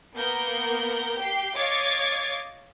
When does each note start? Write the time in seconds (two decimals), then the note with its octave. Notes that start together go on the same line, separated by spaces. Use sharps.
0.14 A#3 B3 A#4 G6
1.19 G4 G5 C7
1.56 C#5 D#5 F5 D6 G#6 A6